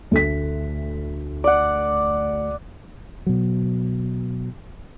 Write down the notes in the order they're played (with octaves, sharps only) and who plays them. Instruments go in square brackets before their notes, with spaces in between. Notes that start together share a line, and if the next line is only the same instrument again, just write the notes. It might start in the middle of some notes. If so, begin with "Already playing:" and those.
[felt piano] D2 A3 B6
[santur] D5 F#5
[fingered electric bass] B2 F#3